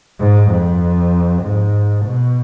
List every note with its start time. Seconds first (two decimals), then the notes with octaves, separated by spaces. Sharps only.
0.19 G#2
0.51 F2
1.43 G#2
2.05 B2